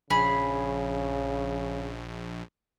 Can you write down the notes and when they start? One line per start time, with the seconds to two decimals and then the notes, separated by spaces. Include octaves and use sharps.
0.10 A#1 C#3 G#4 B5